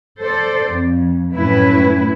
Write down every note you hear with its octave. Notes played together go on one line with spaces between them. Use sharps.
A4 C5 D5
F2
F#2 A2 C#4 E4 B4